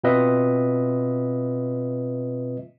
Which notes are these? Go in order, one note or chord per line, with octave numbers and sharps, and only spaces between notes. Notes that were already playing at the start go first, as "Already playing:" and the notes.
B2 C4 F4 B4 D#5 E5